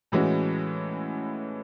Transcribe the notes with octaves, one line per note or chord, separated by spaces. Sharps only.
A2 E3 G#3 C#4 F#4